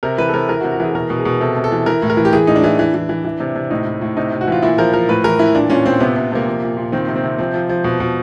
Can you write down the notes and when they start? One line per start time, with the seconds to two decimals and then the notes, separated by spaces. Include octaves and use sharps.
0.03 C3 A#4
0.18 E3 B4
0.29 A4
0.34 C3 A#4
0.49 E3 A#4
0.61 F#4
0.64 C3
0.72 F#4
0.80 E3 G#4
0.95 B2 A#4
1.10 B2
1.18 G#4
1.25 B2
1.41 C3 A4
1.56 C3
1.64 A4
1.72 E3
1.86 E3 A#4
2.02 A2
2.10 A#4
2.17 E3
2.25 G4
2.33 E3 G#4
2.47 A2 D#4
2.56 D4
2.64 E3
2.79 E3
2.94 E3
3.09 E3
3.25 E3
3.40 C3
3.56 C3
3.71 A2 D#4
3.86 A2
4.01 A2
4.17 C3 D#4
4.32 C3
4.41 F#4
4.47 E3 F4
4.62 A#2 E4
4.78 F3 A#4
4.93 F3 A#4
5.09 A2 B4
5.24 E3 A#4
5.39 E3 E4
5.55 A#2 D4
5.70 A#2 C#4
5.85 A#2 C4
6.00 C3 B3
6.16 C3
6.32 C3 A#3
6.47 F3
6.62 A#2
6.77 A#2
6.92 D#3 C4
7.08 C3
7.16 C4
7.24 C3
7.38 F3 C4
7.54 F3
7.69 F3
7.84 B2
8.00 B2